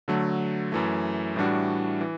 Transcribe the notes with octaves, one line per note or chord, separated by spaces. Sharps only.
D3 F#3 A3
F#2 E3 A3
A2 E3 G3 D4 F#4
E3